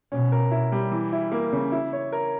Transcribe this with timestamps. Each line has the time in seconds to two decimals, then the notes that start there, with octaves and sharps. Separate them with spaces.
0.12 B2 C#4
0.32 A#4
0.51 E4
0.72 G3
0.92 E3
1.12 E4
1.32 A#3
1.53 C#3
1.72 E4
1.93 C#5
2.12 A#4